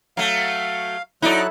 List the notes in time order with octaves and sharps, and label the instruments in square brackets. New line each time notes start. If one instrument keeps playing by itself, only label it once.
[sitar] F#3 A3 [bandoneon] F5
[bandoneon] F#3 F#6 [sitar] D#4 D5 [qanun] E4 A4